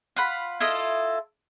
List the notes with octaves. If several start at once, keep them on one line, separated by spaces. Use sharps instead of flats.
F4 F#5 B5
E4 F4 A4 D#5